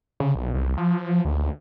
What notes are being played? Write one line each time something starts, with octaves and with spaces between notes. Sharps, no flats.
C#3
B1
C2
F3
D2